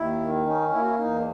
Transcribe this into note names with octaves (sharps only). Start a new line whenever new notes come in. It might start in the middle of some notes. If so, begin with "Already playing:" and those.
Already playing: D#2 E4
D#3
C#4 D#4
A#3 E4
F#4
E4
E2 D#4